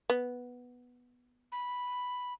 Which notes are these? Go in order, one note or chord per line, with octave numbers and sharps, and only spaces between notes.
B3
B5